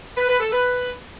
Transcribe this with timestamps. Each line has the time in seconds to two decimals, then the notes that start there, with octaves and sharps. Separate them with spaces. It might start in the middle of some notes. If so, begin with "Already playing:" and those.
0.16 B4
0.28 B4
0.40 A4
0.51 B4